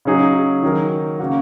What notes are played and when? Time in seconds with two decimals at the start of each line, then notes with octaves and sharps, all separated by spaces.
0.05 C#3 F#3 D#4 G#4
0.63 D#3 F#3 D#4 A#4
1.20 C#3 A#3 F#4